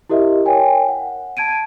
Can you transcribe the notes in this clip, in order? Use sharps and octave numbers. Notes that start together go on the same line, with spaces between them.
E4 G4 A#4 D#5 E5
A#4 C#5 G5 G#5
F#5
A5 G#6 D7 D#7